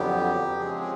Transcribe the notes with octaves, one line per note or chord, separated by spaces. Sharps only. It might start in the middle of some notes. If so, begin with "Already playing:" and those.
Already playing: F2 D3 F#3 B3 G4
C#3 F3 G#3 C4 G#4
G#4